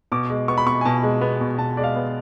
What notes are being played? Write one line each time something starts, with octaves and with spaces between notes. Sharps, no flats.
B2 D6
G#3
B3 C#6
B5
B2 C#6
G#5
B2 A5
G#3
B3
B2
B2 A5
G#3 D5
F5
B3